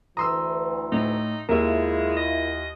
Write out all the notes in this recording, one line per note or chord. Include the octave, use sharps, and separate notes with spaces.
D2 E3 A#5 C6 D#6 E6
A2 D#4
D#2 G#3 E4 F4 A#4 E5
D#5